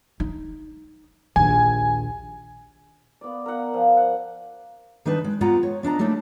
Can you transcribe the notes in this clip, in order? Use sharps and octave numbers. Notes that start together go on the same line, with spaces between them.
D#4
A#1 D#2 G#5
B3 D5
A#4 F#5
F3
F#5
D#3 G3 D4 D#4 B4 A5
G#3
G3 G#3 B3 F4 F#5 A#5
C#5
B3 D4 D#5 A#5
F#3 G3 A3 A#3 D4 D#4